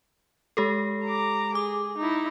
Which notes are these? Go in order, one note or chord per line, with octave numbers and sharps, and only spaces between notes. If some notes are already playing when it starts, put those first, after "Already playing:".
G#3 G4 A4
A#5 D6
G#4 D6
D#4 E4